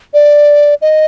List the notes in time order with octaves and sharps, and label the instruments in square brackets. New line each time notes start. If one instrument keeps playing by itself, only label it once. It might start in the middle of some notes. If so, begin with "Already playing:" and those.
[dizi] D5
D#5